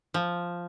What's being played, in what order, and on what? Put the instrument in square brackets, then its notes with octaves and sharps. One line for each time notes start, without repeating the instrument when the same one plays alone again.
[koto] F3